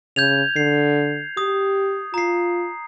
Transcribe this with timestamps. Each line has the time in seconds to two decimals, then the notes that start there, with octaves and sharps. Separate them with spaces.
0.16 C#3 G6 G#6 F7
0.56 D3 C7
1.37 G4 D#6
2.14 F4 A#5 C7